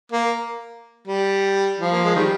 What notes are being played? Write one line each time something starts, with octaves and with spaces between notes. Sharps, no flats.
A#3
G3
F3
A#3
G#3
D#3 G3